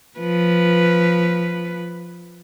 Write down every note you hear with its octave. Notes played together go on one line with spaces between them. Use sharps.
F3 B4